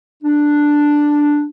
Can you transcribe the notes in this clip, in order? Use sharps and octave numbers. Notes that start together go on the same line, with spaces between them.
D4